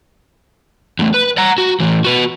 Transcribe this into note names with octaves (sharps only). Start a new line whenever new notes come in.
E2 A3
B4
F#5 A#5
F#4
A2 E3
F#4 B4